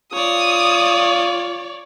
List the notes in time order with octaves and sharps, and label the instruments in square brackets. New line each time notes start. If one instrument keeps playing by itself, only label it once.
[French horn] F4 [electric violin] C#5 D5 [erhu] D#6